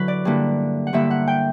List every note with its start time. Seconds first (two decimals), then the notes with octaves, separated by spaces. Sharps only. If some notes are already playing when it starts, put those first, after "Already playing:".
Already playing: D3 F#3 E4 B4
0.08 D5
0.25 G2 D3 A#3 E4
0.87 F#5
0.93 G2 D3 A#3 E4 E5
1.11 F#5
1.28 G5